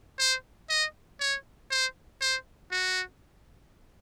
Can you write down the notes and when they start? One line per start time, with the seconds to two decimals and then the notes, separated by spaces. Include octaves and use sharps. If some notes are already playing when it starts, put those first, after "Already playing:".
0.19 C5
0.69 D#5
1.20 C#5
1.71 C5
2.21 C5
2.71 F#4